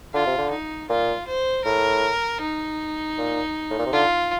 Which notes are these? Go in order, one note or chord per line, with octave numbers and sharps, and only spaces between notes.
D3 F4
C3
D3
D#4
A#2 F4
C5
A2 A#4
D#4
A#2
A2
A#2
C3
D3 F4